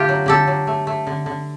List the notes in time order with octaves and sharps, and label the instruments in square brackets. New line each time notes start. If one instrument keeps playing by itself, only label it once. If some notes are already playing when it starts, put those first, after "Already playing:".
Already playing: [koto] D3 A3 F4 G4
F#3
D3 G4 A4
F#3
A3
A3
D3
D3